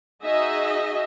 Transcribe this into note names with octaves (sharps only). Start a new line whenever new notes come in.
D#4 F#4 G#4 D#5 E5